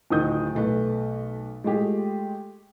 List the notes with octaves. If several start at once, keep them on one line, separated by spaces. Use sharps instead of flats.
D1 D#3 F4 D#6 G6
B1 A3 B4
G#3 A3 F4 G4 G#4